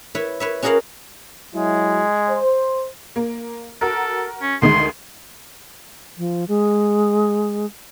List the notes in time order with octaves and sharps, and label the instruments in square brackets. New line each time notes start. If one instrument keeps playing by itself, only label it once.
[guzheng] E4 B4 C#5
B4 C#5 E5
C#4 F#4 G#4 A#4 F5 F#5
[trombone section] F#3 E4 [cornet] G#3
[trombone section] C5
[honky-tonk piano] A#3
[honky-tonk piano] F#4 A#4 [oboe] A4
[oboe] C#4
[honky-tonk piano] D2 D#3 G#3 [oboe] C6
[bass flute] F3
G#3